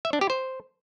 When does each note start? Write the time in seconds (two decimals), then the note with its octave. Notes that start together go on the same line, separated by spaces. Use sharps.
0.05 E5
0.13 D4
0.21 G4
0.30 C5